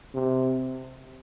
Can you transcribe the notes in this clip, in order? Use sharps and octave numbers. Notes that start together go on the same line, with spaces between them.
C3